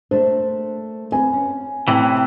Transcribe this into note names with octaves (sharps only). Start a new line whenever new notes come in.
A3 A#3 D4 C5
C4 B4 G#5
C#4
A2 C3 E3